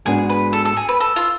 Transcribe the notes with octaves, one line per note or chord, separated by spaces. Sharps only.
G#2 G#3 B3 D4 F#4 G#4
B4
A4
A4
G#4
B4
A4
F4